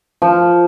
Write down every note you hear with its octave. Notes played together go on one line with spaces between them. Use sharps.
F3